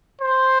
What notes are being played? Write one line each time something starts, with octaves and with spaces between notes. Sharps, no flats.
C5